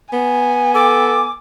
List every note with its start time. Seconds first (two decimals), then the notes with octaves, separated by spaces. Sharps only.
0.13 B3 G#5
0.75 A4 D6